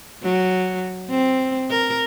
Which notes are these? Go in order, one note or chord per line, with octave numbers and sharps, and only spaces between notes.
F#3
C4
A#4